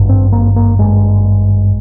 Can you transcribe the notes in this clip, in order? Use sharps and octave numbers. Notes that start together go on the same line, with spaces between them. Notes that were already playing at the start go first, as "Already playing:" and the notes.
Already playing: G#1 G2
C4
A#3
A#3
G#1 G2 G#3